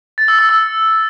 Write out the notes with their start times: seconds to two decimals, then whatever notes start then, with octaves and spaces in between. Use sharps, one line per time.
0.18 A6
0.28 E6
0.39 E6
0.49 E6